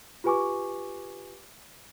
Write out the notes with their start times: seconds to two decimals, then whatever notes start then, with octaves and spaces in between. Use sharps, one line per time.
0.24 F4 G4 B4 G#5 C#6 D6